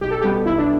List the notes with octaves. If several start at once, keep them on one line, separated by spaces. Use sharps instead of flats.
B1 G4
A4
B2 G3 B3 G4
B1 E4
D4